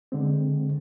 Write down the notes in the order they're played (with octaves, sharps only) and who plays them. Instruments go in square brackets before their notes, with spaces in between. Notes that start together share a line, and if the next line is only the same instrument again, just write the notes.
[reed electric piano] D3 G#3 C4